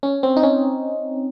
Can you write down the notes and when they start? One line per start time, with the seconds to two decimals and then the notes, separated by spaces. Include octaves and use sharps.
0.03 C#4
0.23 C4
0.36 D#4
0.43 C#4